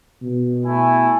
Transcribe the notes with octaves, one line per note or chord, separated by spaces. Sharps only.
B2
A3 E4 G#5